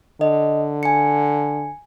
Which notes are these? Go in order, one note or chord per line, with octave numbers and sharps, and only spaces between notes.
D3 D#5
G#5 C#7